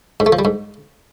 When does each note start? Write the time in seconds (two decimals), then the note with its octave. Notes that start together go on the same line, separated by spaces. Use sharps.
0.20 G#2
0.26 A3
0.33 F3
0.39 G3
0.45 G#2